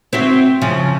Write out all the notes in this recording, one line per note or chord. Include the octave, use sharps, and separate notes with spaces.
C4 E4 F#4
C#3 F3